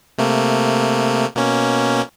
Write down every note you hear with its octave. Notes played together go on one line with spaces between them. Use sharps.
C3 A3 A#3
B2 A#3 C#4